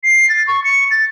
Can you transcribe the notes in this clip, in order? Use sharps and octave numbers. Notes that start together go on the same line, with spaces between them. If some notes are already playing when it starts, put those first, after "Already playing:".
C7
A6
C#6
C#7
A6